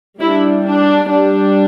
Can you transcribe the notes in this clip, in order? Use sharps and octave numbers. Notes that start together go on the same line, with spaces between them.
G3 D4 E4
D4
G3 D4